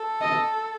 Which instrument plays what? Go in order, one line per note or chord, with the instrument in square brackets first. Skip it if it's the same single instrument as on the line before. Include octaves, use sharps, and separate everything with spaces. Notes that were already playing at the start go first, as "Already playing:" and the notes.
Already playing: [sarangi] A4
[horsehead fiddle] D#5